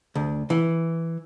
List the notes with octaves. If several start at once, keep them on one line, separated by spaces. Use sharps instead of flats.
D2
E3